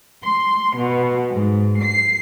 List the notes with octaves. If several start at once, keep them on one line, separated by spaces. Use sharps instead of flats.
C6
B2
G#2
C7